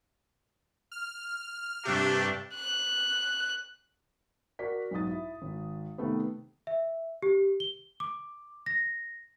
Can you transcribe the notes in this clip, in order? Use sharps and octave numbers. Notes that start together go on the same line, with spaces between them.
F6
G2 C3 A3 D4 G4
F#6
F#4 A#4 D5 B6
B1 G#2 D#4 F#4 D#6 A6
E4
G#1
C3 D#3 A3 B3
E5
G4
G7
D6
A#6